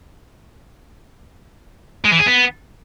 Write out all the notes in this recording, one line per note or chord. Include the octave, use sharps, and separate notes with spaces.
G#3
E3
G#4
B3